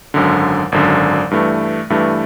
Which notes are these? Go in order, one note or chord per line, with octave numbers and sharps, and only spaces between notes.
G#1 F#2 D3
G#1 F#2 D3
G2 E3 A3
G2 E3 A3